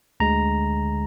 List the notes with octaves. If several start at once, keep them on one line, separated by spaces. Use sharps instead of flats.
D2 D3 G#3 A#5